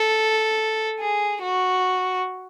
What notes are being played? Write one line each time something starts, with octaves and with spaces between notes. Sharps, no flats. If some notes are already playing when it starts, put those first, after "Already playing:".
Already playing: A4
G#4
F#4